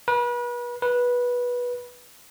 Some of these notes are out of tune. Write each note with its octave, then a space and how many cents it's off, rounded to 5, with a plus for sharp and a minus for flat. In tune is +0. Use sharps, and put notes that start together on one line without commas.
B4 -35
B4 -15